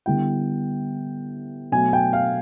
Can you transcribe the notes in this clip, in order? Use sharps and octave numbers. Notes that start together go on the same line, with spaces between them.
D3 G3 B3 E4 G5
B2 F#3 A3 G#5
G5
F5